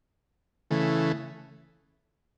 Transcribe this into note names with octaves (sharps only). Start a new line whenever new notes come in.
C#3 E3 A3